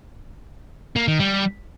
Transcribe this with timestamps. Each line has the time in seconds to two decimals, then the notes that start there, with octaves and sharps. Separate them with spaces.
0.96 A#3
1.08 D#3
1.19 G3